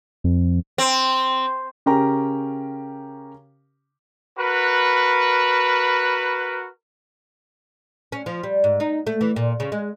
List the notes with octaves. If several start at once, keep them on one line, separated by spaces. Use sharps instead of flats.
F2
C4
C#3 C#4 G4 A#4 G5 A#5
F#4 A#4 B4
C#4
F3
G3
G#2
D#4
A3
E3
A#2
C#3
G#3